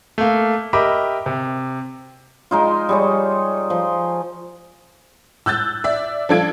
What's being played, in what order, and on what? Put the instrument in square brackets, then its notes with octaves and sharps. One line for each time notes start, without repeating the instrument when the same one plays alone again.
[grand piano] A3 A#3
G4 A#4 D#5 E5 B5 D6
C3
[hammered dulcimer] G#3 D#4 F4
G3 G#4 C#5
F3
[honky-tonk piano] E6 F#6 G6 A6
D5 E5
F3 D4 A4 F5 G#6 D7